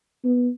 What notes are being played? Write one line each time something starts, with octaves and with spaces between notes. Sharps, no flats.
B3